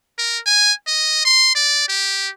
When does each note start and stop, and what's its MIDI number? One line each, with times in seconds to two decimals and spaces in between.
0.18 0.39 70
0.46 0.72 80
0.87 1.25 75
1.25 1.50 84
1.55 1.88 74
1.89 2.30 67